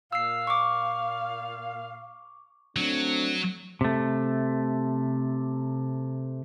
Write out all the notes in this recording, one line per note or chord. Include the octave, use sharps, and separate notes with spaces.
A#2 F5 E6 C7
C#6 D6
F#3 A3 C4 D4
C3 A3